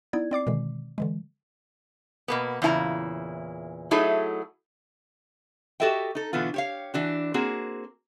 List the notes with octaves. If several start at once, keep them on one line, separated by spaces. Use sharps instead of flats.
B3 D#4 E4 D5 G#6
C4 D5 D6 C7
B2 D3 D#3 G#3
D3 E3 G#3
B2 A#3 B3
E2 A#2 C#3 E4 A5 A#5
F#3 A3 D#4 E4 G#4
F#4 G4 A4 D#5 E5 G5
D#4 A4
B2 D3 E3 B3 F4
G4 C#5 F5
E3 D4 F#4
A#3 C4 F#4 G#4